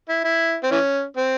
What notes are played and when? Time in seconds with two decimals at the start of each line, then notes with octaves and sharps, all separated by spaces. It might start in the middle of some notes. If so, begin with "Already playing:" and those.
0.09 E4
0.24 E4
0.63 C4
0.71 E3 C#4
1.17 C4